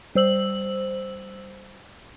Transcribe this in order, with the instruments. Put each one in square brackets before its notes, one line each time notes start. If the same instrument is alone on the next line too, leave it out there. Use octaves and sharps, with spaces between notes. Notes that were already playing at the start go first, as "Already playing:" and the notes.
[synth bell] G3 C5 E6 F#7